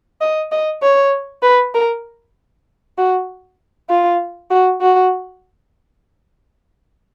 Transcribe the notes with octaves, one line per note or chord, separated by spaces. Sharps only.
D#5
D#5
C#5
B4
A#4
F#4
F4
F#4
F#4